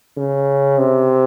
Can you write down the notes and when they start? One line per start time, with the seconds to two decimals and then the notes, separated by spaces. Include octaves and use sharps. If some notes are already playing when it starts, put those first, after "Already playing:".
0.17 C#3
0.78 C3